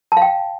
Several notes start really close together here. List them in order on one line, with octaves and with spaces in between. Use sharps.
A5 F5 G5